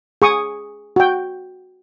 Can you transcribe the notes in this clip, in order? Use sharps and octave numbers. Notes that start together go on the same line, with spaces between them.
G#4 C#6 D#6
F#4 G5